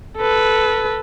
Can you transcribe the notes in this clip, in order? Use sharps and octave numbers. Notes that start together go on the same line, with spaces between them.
A4 B4